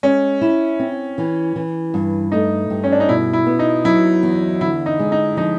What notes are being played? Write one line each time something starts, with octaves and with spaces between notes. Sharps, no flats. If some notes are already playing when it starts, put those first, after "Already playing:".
G#3 C#4
E4
C4
E3
E3
G2
A3 D#4
G2
C#4
D4
D#4
B2 E4
E4
B3
D#4
F#3 E4
E2
D3 E4
D#4
G#3
D#4
F3 D#4